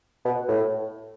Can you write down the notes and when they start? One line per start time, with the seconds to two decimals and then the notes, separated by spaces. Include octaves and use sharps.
0.25 B2
0.48 A2